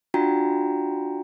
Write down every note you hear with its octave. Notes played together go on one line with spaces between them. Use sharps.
D4 F4 F#4 G5 A#5